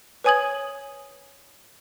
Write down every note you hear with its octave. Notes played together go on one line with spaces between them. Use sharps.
B4 C#5 G#5 D#6 G#6 F#7